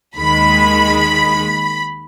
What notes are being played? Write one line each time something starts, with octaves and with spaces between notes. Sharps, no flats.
D#2 D#3 G#3 B5